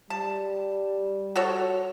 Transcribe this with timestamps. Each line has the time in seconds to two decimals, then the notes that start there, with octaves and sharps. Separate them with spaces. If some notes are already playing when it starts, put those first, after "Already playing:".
0.10 G3 A5
1.36 F#4 A4 C#5